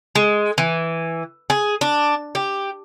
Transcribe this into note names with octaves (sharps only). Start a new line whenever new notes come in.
G#3
E3
G#4
D4
G4